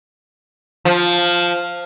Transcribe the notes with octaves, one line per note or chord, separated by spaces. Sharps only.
F3